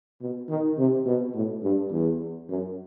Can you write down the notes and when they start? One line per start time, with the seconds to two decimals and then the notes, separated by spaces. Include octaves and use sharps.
0.21 B2
0.49 D#3
0.78 C3
1.06 B2
1.34 A2
1.63 G2
1.91 E2
2.49 F#2